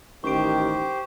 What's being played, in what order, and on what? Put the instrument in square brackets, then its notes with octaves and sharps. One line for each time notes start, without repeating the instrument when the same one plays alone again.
[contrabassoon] A1 [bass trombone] D#3 [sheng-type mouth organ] G4 C5 [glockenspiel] C#6 D7